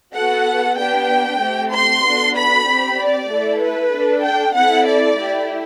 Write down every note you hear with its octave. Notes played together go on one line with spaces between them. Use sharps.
B3 F#4 A4 F#5
B3 D4 G4 G5
A3 C4 G4
C6
B3 D4 F#4 A4
B5
C4 G4
D5
A3 E4 A4
B4
D4 A4
G5
C4 E4 A4 F#5
D5
A3 E4 G4